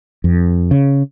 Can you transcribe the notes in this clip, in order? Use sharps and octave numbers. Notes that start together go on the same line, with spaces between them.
F2
C#3